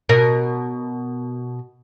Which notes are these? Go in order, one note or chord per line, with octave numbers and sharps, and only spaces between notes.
B2 A#4